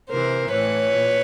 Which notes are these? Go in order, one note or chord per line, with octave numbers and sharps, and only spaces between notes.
C3 E3 A#4 C5
A2 E3 B4 C#5
A#2